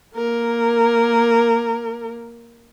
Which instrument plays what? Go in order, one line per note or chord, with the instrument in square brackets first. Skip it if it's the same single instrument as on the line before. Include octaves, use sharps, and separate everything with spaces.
[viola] A#3 A#4